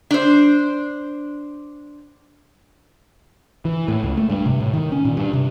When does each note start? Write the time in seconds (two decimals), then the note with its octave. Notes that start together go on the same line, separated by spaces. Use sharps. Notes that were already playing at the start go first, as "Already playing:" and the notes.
0.11 D4 C5
3.65 E3
3.88 A2
4.03 C#2
4.17 A3
4.30 G2
4.46 C3
4.60 A2
4.73 D#3
4.92 C#4
5.05 A#2
5.17 G2
5.33 C3